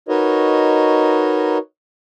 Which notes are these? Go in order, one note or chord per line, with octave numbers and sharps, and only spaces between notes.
D#4 F#4 A#4 B4 C#5 D#5